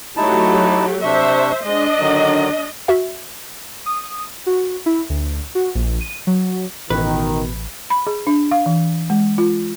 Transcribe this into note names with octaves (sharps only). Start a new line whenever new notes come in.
F#3 A3 D#4 E4 G4 A5
C3 D4 C5 E5 C#6
G#3 D4 D#5
D3 D#3 F#3
F#4 E5
D#6
F#4
E4
D2
F#4
A#1
D#7
F#3
A1 B2 D#3 B4
B5
G#4
D4
F5
E3
G#3
F4